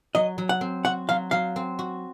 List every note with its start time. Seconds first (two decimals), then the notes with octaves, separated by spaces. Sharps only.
0.15 F#3 D#5
0.38 F#3
0.49 F#5
0.61 C4
0.85 F#4 F#5
1.09 F#3 F5
1.31 F#3 F5
1.56 C4
1.79 F#4